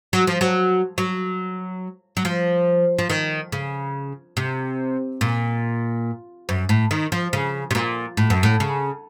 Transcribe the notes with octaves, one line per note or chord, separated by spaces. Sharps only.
F#3
F3
F#3
F#3
F#3
F3
F3
D#3
C#3
C3
A#2
F#2
A2
D#3
F3
C#3
C3
A#2
A2
F#2
A2
C#3